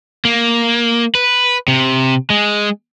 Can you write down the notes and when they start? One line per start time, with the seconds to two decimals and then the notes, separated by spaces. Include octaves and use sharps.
0.25 A#3
1.15 B4
1.68 C3
2.30 G#3